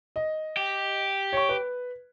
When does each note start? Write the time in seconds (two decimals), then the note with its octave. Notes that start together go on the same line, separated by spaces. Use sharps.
0.16 D#5
0.57 G4
1.33 C#5 C#6
1.49 B4